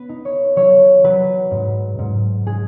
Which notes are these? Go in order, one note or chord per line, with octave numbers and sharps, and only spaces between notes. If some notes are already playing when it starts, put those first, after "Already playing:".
Already playing: B3 B4
D#4
C#5
F#3 C#5
F#3 B4
G#2
G#2
G#3 G#4